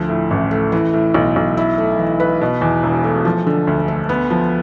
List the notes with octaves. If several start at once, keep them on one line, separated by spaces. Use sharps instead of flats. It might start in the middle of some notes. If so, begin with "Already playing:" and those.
Already playing: D2 F3
A2
A1
A3
E3
A2
B1
B1
E4
A3
E3
B4
B2
E2
E1
A3
F3
D3
D2
A3
B3
F3